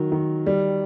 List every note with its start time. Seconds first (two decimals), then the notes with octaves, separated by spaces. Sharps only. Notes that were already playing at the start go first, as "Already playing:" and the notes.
Already playing: D#3 F#3
0.12 D#3
0.46 G3